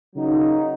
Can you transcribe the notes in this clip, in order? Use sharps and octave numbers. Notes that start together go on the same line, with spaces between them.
C#3 F#3 A#3 D#4